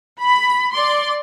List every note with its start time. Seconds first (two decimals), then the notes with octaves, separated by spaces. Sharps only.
0.22 B5
0.73 D5 C6